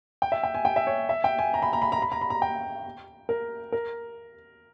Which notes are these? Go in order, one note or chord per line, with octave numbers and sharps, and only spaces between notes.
G5
E5
G5
G#5
G5
E5
C#5
E5
G5
G#5
A#5
B5
A#5
B5
A#5
B5
A#5
B5
A#5
G5
A#4
A#4